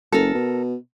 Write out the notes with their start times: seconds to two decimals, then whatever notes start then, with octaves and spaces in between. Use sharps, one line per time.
0.12 F#1 A4 A#4
0.34 B2